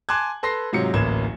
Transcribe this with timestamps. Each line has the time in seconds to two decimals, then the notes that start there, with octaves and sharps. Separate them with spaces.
0.09 G#5 A5 C6 D6 F#6 G#6
0.43 A4 B4 C6 A#6 C7
0.73 G#2 C3 F#3 F4 C#7
0.93 D1 A1 A#3 G#6 E7